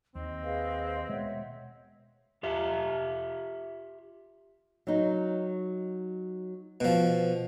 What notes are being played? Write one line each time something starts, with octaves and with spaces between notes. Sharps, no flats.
D#2 C4 D#5
G#4 B4 F5
B2 G#3 C#5 E5 F#5
F4 G4 E5
F#3 D#4
B2 F3